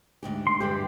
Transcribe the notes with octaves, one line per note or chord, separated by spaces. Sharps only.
D2 G#2 G4
C6
G2 D3 E3 G4